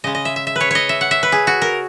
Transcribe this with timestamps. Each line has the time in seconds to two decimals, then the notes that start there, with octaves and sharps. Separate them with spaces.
0.04 C#3 G#3 D#5
0.15 D#5
0.25 E5
0.36 E5
0.47 E5
0.56 B4
0.61 C#5
0.71 C#5 D#5
0.89 E5
1.01 F#5
1.11 E5
1.23 B4
1.32 G#4
1.47 F#4
1.62 A#4